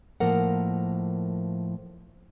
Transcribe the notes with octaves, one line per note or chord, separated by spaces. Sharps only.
A2 F3 A#3 A#4 F#5